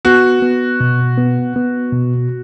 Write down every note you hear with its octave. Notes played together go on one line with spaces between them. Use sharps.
B3 F#4
B3
B2
B3
B3
B2